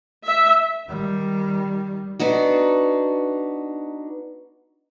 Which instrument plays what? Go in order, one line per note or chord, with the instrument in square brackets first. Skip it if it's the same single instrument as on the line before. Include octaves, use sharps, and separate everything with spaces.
[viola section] E5
[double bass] D#3 G3
[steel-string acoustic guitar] B3 D4 D#4 F#4